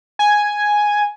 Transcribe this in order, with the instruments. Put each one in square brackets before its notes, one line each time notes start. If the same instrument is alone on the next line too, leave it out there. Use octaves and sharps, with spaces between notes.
[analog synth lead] G#5